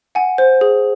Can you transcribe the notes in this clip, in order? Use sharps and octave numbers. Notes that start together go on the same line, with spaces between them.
F#5 G#5
C5
G#4